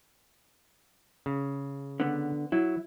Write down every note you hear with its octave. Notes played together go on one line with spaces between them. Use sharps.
C#3
D3 B3
F#3 E4